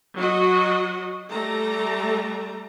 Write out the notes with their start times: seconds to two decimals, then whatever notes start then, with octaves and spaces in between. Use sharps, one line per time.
0.16 F#3 F#4 D#5
1.29 G3 A3 A#5